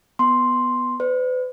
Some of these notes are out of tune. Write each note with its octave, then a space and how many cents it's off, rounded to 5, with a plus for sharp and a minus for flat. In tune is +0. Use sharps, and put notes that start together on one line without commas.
B3 +0 C6 +0
B4 +40 D5 -15